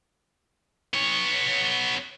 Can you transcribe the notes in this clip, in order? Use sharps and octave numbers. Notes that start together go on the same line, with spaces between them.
B3 C#5